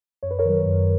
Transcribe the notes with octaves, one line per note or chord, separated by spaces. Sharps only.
F#2 C#5
B4
A#4 C#5
D#3 F#3
F#2